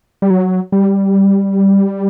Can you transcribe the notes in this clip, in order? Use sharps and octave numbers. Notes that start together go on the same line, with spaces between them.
G3
F#3
G3